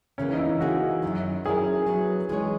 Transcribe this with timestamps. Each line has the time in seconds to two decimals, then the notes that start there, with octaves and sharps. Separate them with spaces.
0.18 E2 C#3 E3 A#3 C#4
0.33 D#4
0.39 E4
0.60 E3 A#3 C#4 F#4 G#4
1.02 F#2 D#3 F#3
1.45 F#3 C#4 E4 G#4 A#4
1.86 F#3 B3 F#4 B4
2.29 E3 G#3 D#4 G#4 C#5